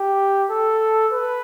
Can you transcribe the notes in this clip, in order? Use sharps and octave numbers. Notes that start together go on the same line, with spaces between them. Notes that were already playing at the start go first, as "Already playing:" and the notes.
Already playing: G4
A4
B4